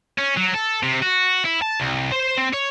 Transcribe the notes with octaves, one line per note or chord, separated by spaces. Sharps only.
C#4
F#3
A4
C3
F#4
E4
A5
C2
C5
C4
C#5